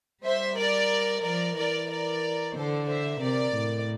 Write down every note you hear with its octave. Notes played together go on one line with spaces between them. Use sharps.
G3 C5 E5
A#4 D5
F3 A#4 D5
E3 A#4 D5
A#4 D5
D3 A4 C5
C5 E5
C3 A#4 D5
A2